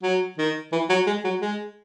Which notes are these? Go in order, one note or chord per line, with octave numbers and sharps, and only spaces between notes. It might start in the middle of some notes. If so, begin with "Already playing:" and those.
F#3
D#3
E3
F#3
G#3
F#3
G#3